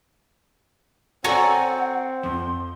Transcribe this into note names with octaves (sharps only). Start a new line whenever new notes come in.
C4 F#4 A4 C#5 D5 F#5 G#5 A#5
F2 F3 C6